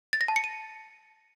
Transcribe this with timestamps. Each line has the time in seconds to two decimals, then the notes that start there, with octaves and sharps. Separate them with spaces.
0.13 A6
0.21 A#6
0.28 A5
0.36 C#7
0.44 D#7